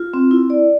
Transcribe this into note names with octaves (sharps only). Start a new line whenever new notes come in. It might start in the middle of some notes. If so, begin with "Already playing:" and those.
Already playing: F4
C4
E4
D5